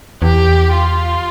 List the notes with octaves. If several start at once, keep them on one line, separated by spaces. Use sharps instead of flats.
E2 G4
F4